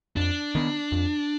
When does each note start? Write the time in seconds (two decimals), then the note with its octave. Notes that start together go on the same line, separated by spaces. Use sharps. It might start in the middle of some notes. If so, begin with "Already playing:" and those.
0.16 F2 D4
0.55 D#3 B3
0.92 F2